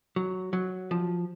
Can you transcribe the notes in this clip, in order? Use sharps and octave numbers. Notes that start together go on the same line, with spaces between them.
F#3
F#3
F3